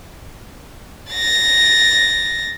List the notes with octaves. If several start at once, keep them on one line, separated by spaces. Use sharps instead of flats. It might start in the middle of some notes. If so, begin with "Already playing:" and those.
A6 A#6